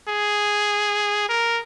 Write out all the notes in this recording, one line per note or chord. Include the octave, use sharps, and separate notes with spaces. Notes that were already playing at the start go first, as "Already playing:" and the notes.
G#4
A#4